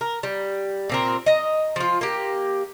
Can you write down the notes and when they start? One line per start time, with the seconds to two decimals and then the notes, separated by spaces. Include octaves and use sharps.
0.01 A#4
0.23 G3
0.90 A#2 C4 A#4
1.26 D#5 A#5
1.76 F3 F4
2.01 A#3 G4